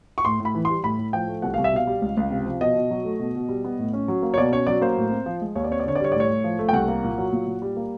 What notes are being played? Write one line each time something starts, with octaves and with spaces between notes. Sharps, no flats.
C#6
A2 C6
A2
B5
E3
G3 C6
A2 B5
A2
F3 G5
A3
C2 F#5
C2 F5
E5
B2 F5
G3
C#2
C#2
C3
F3
B2 D#5
B2
F#3
A3
B2
B2
G3
B3
A2
C#4
F#3
A#3
C#5
B2 D5
C#4 C#5
F#3 D5
A#3 C5
A2
C4
F3
G#3
D#2 C#5
D5
C4 C#5
D5
D3 C#5
D5
G3 C#5
A2 D5
C#5
A2
F3
A3
G5
C2 F#5
A#3
A#2
F#3
A#2
A#2
G3
A#3